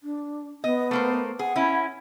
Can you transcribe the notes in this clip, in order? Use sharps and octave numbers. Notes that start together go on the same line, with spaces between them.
D4
B3 D#5
A3 A#3 C5
G#4 F#5
C#4 E4